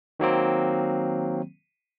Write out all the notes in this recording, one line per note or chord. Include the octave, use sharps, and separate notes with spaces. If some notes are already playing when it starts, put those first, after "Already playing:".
D#3 F#3 A#3 C4